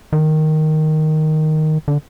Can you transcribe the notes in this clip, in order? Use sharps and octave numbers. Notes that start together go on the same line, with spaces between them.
D#3
D3